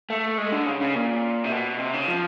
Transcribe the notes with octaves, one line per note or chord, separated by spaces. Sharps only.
A3
G#3
D3
C#3
C#3
A#2
C3
B2
C3
C#3
F3